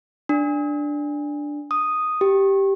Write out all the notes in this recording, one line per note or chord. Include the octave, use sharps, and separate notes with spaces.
D4
D#6
G4